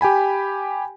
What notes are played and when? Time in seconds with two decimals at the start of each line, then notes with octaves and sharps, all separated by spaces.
0.01 G4 G5 G#5 B5